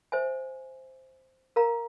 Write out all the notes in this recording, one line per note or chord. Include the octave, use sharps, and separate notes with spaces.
C5 E5 G#5
A#4 F5 A#5